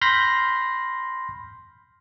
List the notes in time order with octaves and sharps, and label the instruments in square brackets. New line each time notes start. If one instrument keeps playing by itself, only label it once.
[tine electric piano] B5 C6 F6 G6 A#6